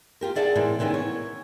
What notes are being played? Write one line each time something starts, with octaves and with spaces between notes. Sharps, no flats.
F4 G4 A#4
G#4 D5 E5 F#5 G5 A5
A2 C3 E3 A#4 C5
C3 D#3 E3 B3 C#4
C#5